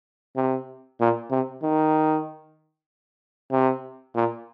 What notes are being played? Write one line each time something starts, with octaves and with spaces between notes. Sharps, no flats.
C3
A#2
C3
D#3
C3
A#2